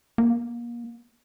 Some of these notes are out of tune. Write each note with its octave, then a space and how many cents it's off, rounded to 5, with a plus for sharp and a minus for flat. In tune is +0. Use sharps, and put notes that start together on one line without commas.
A#3 +30